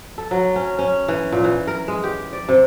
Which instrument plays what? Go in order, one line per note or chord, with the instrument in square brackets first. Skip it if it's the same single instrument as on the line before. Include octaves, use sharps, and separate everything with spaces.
[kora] A4
F#3
C#4
C#4
E3
A#2
E3
A#4
G#3
G4
D5
C3